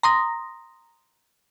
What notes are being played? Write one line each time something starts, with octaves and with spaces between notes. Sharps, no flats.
A#5 C6 D#6 A#6